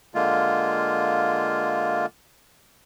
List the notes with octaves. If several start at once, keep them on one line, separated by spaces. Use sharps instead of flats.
D3 G#3 A#3 F4